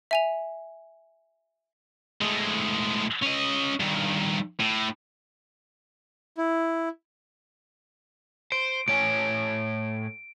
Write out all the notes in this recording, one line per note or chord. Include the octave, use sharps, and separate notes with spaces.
E5 G#5 F7
A2 G#3
C#4 D#5
G2 D#3
A2
E4
C5 D7
A2 C#5 G#5 D7